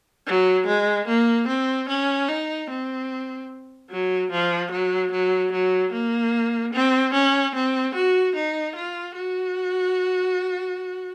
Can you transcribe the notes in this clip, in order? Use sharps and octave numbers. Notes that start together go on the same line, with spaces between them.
F#3
G#3
A#3
C4
C#4
D#4
C4
F#3
F3
F#3
F#3
F#3
A#3
C4
C#4
C4
F#4
D#4
F4
F#4